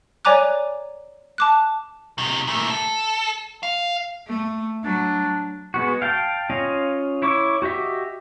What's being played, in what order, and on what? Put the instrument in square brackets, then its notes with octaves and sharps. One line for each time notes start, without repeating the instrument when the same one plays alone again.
[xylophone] C#5 D5 G#5 A#5 D6 F#6
A5 D6 F#6
[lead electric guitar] C3 D#3
A#2 A3
A4
F5
[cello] A3
[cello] F#3 [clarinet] D4
[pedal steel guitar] G#3 B3 F#4
F5 G5 A5
C#4 F4 D#5 F5
E4 C#5 C#6 D6
F#4 G4 D#5 E5